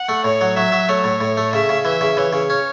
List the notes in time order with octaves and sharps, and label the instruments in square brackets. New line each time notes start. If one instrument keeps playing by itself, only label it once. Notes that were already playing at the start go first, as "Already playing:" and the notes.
Already playing: [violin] F#5
[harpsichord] A3
[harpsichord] A2 [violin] C#5
[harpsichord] F#3
[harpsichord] F#3 [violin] E5
[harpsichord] F#3
[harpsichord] A3 [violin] C#5
[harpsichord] A2
A2
A3
[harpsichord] C#3 [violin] E5
[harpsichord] C#3
[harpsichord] E3 [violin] E5
[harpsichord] C#3
[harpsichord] E3 [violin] C#5
[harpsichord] C#3
C#4